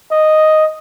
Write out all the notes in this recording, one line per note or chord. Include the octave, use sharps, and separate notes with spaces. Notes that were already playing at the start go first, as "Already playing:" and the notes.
D#5